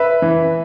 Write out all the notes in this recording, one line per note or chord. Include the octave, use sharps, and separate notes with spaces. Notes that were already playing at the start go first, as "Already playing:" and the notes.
Already playing: B4 E5
E3